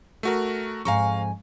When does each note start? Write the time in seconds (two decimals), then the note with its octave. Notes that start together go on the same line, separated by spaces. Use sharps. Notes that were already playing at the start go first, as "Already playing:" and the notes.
0.23 A3 F#4 A#4
0.85 F2 G#2 F5 G#5 A#5 C#6